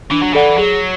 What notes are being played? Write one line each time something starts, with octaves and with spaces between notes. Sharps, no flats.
E3 D4
F#3
E3 A4 D5 F#5 B5
F#3 G#4